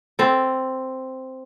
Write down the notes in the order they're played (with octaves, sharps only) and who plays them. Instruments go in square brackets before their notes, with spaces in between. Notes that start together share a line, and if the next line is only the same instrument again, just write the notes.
[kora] C4 A4